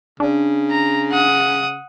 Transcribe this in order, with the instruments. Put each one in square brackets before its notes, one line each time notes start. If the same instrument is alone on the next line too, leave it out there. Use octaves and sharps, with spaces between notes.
[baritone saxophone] C#3 [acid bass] D4
[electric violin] A#5
F#5 D#6